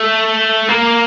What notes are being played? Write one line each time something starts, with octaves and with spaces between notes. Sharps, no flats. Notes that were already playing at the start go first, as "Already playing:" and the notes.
Already playing: A3
A#3